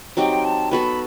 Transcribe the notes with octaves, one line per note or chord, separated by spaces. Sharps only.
F#3 C4 D#4 G4 G5
A5
B3 F#4 A4 B5